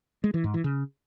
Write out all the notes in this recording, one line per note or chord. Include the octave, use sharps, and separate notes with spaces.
G#3
E3
G#2
E3
C#3